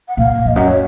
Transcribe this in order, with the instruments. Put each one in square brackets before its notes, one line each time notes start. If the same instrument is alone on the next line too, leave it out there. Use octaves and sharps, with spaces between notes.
[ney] F#5
[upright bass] A#2 [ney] F5
[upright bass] F2 [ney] D#5
[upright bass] F#2
[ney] C#5